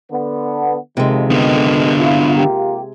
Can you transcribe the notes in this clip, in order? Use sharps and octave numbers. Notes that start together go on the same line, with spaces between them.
D3 B3
F2 C3 D#3 G#3
D3 B3
E4 F4
A#3 F4 G4